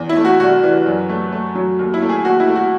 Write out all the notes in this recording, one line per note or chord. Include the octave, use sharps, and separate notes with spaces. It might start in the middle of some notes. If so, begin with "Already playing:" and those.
Already playing: E2
E4
A3
F#4
C2 F#4
E3
F#2
A3
A3
F#3
D#2
E4
A3
G#4
D#2 F#4
E4
A3
F#4